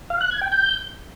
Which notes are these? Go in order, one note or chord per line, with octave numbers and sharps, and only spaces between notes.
F5
F#6
G#6
G5
G6